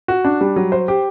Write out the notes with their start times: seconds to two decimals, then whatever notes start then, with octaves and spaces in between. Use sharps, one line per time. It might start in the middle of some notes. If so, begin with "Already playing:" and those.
0.08 F#4
0.25 D4
0.41 G3
0.56 F#3
0.72 C5
0.88 G4